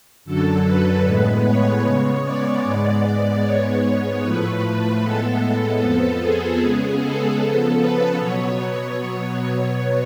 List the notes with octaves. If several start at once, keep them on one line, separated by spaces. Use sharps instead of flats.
F#2 D3 F#3 A4
B4
A2 G#3 B3
C#5
C#3 G#3 B3
D5
G#2 G#3 B3
G#2 G#3 B3 C#5
A2 F3 A3 B4
A2 G#3 B3 A4
F2 F3 B3 A4
G#4
C#3 G#3 B3
A4
C#3 F3 B3
B4
B2 F#3 B3 C#5